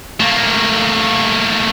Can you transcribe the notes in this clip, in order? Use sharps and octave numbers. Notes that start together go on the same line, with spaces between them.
A3 A#3